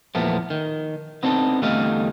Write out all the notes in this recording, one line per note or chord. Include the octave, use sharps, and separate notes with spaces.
E2 A#2 F3 A3 B3
D#3
B3 C4 D4 D#4 F4 A4
E2 D3 G3 A3 D#5 F5